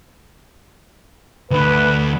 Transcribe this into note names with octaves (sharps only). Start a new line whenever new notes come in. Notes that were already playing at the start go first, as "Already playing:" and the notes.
D2 D3 B4